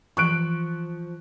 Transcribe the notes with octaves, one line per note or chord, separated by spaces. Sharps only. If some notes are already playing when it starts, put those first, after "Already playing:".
E3 F3 C#6 F#6 D7